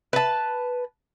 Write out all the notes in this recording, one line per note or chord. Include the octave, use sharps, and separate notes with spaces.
B4 A5